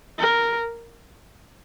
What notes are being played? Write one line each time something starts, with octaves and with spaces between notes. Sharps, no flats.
A#4